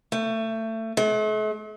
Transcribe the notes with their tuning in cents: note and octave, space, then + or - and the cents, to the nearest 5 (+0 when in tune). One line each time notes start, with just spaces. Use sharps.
A3 +25
A3 -45